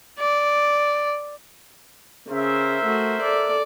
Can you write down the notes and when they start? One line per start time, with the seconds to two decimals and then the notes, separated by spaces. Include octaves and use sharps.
0.19 D5
2.28 C#3 A#4 C5 E5
2.85 A3 F#4
3.22 A4 D5